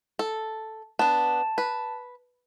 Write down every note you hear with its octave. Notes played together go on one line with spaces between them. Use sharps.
A4
B3 D4 A5
B4